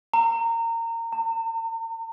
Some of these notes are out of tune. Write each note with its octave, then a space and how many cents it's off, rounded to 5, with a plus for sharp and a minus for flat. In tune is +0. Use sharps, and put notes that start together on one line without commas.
A#5 -25
A#5 -45